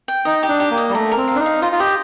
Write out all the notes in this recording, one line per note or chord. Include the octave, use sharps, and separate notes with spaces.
G5
D#4 D#5
G4
D4
G4
A#3
D#5
G3
A3 A#5
A#4
C4
F5
D4
D#4
F5
F4 D#5
F4
G4 D#5